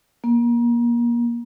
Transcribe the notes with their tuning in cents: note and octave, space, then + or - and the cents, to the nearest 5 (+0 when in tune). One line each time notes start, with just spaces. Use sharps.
A#3 +30